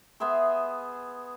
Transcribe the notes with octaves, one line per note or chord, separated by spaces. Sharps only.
B3 G#4 E5 C6